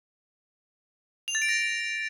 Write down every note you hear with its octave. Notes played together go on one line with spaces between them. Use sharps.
F7
A6
D7
A#6